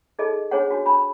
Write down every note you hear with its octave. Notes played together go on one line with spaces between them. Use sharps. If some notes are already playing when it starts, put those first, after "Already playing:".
D#4 G#4 A4 D#5
D4 G#4 C5 C#5 F#5
D4 F#4
D4 B5